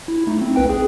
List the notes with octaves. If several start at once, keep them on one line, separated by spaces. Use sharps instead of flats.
E4
A3 D#4
C4
B1 B4 G5
G#4